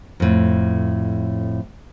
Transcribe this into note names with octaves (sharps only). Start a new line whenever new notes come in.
F2 A2